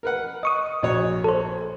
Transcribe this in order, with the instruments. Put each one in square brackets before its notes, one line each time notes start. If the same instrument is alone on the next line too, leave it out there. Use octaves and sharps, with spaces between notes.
[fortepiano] A#4 B4 F#5
[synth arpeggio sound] D#5 C#6 D#6
[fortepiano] A#1 F#4 C#5
[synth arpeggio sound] A4 C5